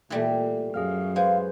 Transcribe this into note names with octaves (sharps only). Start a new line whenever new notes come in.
A#2 E3 G3 A3
F#2 G#4 F5 F6
G#3 B4 C5 F5